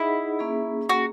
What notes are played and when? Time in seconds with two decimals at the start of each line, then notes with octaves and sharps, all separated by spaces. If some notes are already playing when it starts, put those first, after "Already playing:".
Already playing: D#4 E4 G#4 D#5 F#5
0.39 A#3 C#4 G#4
0.89 F#4